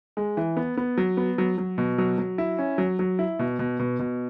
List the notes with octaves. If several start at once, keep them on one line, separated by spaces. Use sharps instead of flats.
G#3
E3
B3
B3
F#3
B3
F#3
F#3
B2
F#3
F#3
E4
C#4
F#3
F#3
E4
B2
B2
B2
B2